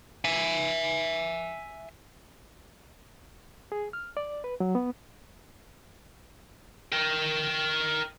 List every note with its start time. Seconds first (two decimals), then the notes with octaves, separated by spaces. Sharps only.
0.25 E5 G#5
3.72 G#4
3.93 F6
4.17 D5
4.44 B4
4.60 F#3
4.75 B3
6.92 A#4 G5